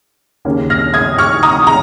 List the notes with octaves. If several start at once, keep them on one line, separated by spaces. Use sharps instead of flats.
D#2 C#3 A#3 C#4
F6 A#6
D#6 G#6
C#6 F6
A#5 D#6
A#5